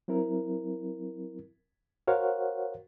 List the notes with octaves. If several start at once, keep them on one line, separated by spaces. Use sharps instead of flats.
F#3 C4 E4 A#4
F#4 A#4 C5 C#5 F5 F#5